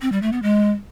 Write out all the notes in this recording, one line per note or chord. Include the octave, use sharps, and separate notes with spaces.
C4
G3
A3
B3
G#3